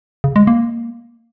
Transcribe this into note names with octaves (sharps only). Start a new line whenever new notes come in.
C#3
G#3
A#3